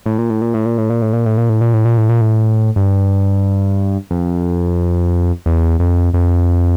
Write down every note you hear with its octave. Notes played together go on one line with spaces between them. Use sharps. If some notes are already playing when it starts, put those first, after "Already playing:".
A2
A#2
A2
A#2
A2
A#2
A2
A#2
A2
A#2
A2
A#2
A2
A#2
A2
A#2
A2
A#2
A2
G2
F2
E2
F2
F2